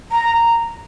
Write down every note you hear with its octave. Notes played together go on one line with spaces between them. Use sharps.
A#5